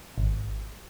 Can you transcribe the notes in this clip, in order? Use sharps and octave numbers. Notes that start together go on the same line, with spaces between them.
G#1